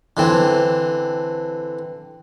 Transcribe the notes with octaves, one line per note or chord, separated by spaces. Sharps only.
D3 E3 C4